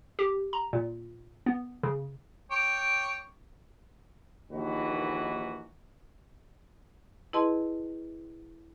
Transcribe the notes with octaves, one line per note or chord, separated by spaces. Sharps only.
G4
A#5
A#2
B3
C#3
C#5 G5 D6
A#1 D#2 E3 D#4 F#4 B4
E4 G#4 B4 D#5 A5 C6